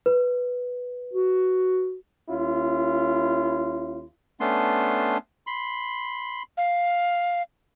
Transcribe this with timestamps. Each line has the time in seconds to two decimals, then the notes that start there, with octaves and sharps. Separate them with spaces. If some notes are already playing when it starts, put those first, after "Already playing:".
0.06 B4
1.13 F#4
2.28 D#2 C#4 E4 F4
4.40 A3 B3 C#4 D4 C6
5.47 B5 C6
6.57 F5